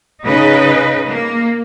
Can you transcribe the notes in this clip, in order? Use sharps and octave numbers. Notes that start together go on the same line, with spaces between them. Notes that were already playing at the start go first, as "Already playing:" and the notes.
C#3 D#4 B4
A#3